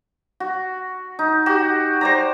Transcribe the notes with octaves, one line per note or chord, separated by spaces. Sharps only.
F#4
D#4
F#4 G4
C5 D5 A#5